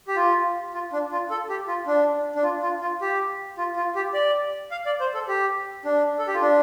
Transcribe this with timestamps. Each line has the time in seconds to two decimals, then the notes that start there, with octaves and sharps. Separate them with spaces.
0.08 G4
0.16 F4
0.73 F4
0.93 D4
1.12 F4
1.30 A4
1.49 G4
1.68 F4
1.87 D4
2.35 D4
2.43 F4
2.62 F4
2.81 F4
3.01 G4
3.58 F4
3.76 F4
3.95 G4
4.14 D5
4.71 F5
4.86 D5
5.00 C5
5.14 A4
5.28 G4
5.85 D4
6.19 A4
6.27 G4
6.34 F4
6.42 D4